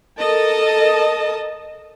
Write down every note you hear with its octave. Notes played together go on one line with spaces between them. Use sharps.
A4 A#4 D#5 A5